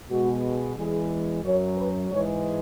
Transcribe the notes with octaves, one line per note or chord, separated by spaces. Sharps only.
B2 G#3 F#4
E2 E3 G#3 G#4
F#2 F#3 C#5
B4
G#2 E3 G#3 C#5